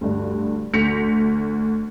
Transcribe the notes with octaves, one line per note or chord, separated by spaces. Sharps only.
D2 G2
D2 G6 A#6 B6 C#7 F7